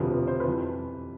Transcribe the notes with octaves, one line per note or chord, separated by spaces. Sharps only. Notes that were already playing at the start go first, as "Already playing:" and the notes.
Already playing: E1 D2 C3 F3 B4
B4
C5
B4
F2 E3 G3